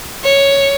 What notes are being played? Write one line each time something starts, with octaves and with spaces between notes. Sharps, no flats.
C#5